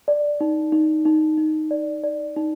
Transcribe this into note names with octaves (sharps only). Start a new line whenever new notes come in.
D5
D#4
D#4
D#4
D#4
D5
D5
D#4